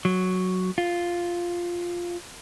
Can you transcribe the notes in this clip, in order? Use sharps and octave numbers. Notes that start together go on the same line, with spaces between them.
F#3
F4